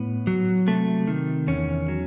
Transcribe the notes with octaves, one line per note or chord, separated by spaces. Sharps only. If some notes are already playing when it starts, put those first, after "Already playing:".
Already playing: A2 B3
F#3
C3 A3
D#3
E2 C#4
F#3